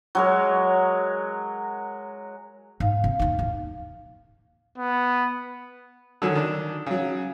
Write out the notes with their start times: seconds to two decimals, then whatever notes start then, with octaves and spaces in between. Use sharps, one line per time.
0.15 F#3 G#3 A#4
2.80 G#2 F5
3.04 C3
3.19 D#2 D#4
3.39 D#2 A2
4.78 B3
6.22 D3 D#3 F#3 G#5
6.35 D#3 D4
6.87 C#3 F#3